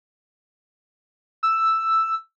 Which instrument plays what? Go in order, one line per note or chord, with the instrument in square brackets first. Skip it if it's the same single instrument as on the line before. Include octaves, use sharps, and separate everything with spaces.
[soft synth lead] E6